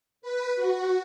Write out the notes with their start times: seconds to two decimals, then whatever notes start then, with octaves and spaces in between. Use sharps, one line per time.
0.22 B4
0.56 F#4